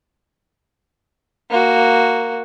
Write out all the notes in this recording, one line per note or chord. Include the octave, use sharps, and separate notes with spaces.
A#3 F#4